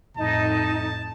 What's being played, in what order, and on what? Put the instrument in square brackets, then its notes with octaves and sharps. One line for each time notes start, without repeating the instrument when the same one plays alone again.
[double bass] F2 A2 [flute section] D#4 [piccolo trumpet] A5